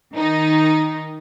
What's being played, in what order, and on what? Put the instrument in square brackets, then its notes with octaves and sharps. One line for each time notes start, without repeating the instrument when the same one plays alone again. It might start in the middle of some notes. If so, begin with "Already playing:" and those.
[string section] D#3 D#4